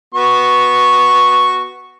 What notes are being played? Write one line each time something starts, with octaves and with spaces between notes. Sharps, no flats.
B3 F#4 C#6